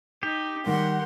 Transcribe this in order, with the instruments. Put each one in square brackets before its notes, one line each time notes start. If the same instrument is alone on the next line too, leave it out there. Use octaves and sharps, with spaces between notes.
[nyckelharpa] D#4 [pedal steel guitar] G4
[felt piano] D#3 G3 [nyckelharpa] A#4 C6 [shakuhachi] F#5